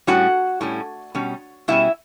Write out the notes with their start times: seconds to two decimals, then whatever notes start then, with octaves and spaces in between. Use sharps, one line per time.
0.07 A2 G3 C#4 F#4 F#5
0.61 A2 G3 C#4
1.15 B2 G3 C#4
1.68 B2 G3 C#4 E4 E5